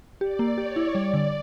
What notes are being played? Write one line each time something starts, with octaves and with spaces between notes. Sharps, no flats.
G4 D5
A#3
G4 C#5
E4
G3 D5
D3